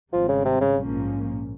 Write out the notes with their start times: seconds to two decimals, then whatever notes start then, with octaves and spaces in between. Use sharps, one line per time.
0.13 G#1 G#2 F3 G3 C4
0.29 C#3
0.45 C3
0.61 C#3
0.77 A#1 G#2 F3 A#3 C#4